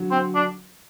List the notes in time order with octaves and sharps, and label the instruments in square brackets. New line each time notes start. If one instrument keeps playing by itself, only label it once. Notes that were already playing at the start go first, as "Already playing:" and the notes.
Already playing: [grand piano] D3 F#3
[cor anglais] C4
D4